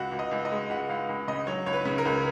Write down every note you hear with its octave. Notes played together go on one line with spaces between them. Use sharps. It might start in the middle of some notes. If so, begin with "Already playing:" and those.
Already playing: C#2 F#4
C#2
D#5
C#2
D#5
G#3
C#2 F#5
C#2 F5
C#2
C#3 D#5
F#3 C#5
C#2 C#5
B4
C#3
A#4
C#2